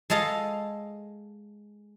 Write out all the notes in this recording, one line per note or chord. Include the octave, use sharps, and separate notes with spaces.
G#3 G#4 A4 D#5 F5